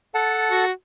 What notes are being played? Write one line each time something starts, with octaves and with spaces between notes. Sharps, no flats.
A4 F#5 A5
F#4